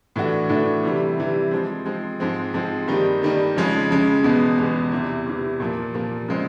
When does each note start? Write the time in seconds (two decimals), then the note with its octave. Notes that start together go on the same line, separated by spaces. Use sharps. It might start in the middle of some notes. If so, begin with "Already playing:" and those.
0.16 A2 E3 A3 D4 F#4
0.49 A2 E3 A3 D4 F#4
0.84 C3 E3 G3
1.18 C3 E3 G3
1.51 F3 G#3 C4
1.86 F3 G#3 C4
2.20 G#2 F3 G#3 C4
2.54 G#2 F3 G#3 C4
2.88 G2 D#3 G3 A#3 D#4
3.22 G2 D#3 G3 A#3 D#4
3.56 F2 C#3 F3 G#3 C#4
3.90 F2 C#3 F3 G#3 C#4
4.24 E2 B2 G#3 B3
4.58 E2 B2 G#3 B3
4.92 E2 C3 E3
5.26 E2 C3 E3
5.60 A#2 F3 A#3
5.94 A#2 F3 A#3
6.28 C#3 F3 G#3 C4